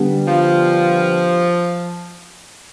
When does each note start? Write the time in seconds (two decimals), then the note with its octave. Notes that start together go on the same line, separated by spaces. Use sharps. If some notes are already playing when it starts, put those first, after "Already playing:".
Already playing: D3 G3 B3
0.26 F3